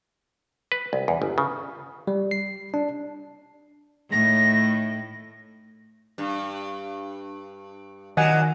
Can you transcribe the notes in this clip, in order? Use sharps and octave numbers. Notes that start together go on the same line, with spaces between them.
B4
C2
E2
G1
C#3
G3
C7
D4
A2 D#3 A#6
G2
A#2 D#3 F#3 D#5 F#5 G#5